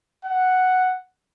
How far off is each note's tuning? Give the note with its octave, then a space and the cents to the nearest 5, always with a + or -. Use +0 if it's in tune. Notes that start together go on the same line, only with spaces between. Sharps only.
F#5 +0